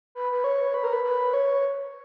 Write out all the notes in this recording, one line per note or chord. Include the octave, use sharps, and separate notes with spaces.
B4
B4
C#5
B4
A#4
B4
B4
C#5